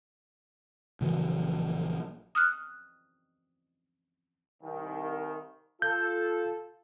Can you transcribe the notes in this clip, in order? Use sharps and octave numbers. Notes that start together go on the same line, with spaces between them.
A#1 C#3 E3 F#3
D#6 F6 F#6
C2 D#3
F4 A4 G6